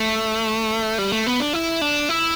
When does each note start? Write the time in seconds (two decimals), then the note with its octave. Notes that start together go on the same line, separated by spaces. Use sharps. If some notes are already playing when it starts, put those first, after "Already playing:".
Already playing: A3
0.98 G3
1.12 A3
1.27 B3
1.40 D4
1.53 E4
1.81 D4
2.09 E4